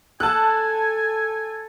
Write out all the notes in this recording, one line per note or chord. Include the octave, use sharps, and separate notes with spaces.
A4 G#5 A5 F#6